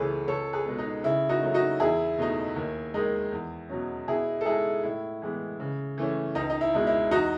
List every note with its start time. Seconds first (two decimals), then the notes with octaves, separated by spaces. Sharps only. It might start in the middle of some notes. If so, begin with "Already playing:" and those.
Already playing: C#2 C#3 E3 A3 C#4 G#4 A4 B4
0.28 C#2 A4 C#5
0.53 G#4 B4
0.66 B2 G#3 B3
0.78 D#4
1.04 C#3 E4
1.29 D#4 F#4
1.42 F#3 A3 D#4
1.54 D#4 F#4
1.80 E2 E4 G#4
2.18 B2 A3 D#4
2.56 D#2
2.94 D#3 G#3 D#4
3.32 E2
3.69 B2 F#3 C#4
4.08 B2 E4 G#4
4.41 A4
4.46 G#3 D#4 E4 G#4
4.83 A2 E4
5.22 E3 G#3 B3
5.60 C#3
5.98 E3 A3 C#4
6.35 C#2 D#4
6.50 D#4
6.61 E4
6.74 B2 G#3 D#4
6.87 E4
7.11 E2 D#4 F#4